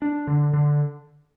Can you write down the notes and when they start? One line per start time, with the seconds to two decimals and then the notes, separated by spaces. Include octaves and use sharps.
0.02 D4
0.27 D3
0.53 D3